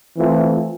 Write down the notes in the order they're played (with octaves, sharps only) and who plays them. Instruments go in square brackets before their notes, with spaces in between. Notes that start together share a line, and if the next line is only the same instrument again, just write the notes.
[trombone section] E3 A3 C4 F4